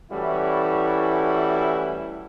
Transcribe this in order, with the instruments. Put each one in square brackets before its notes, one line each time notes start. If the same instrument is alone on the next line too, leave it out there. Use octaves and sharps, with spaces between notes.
[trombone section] E3 G3 A3 C#4 E4 F#4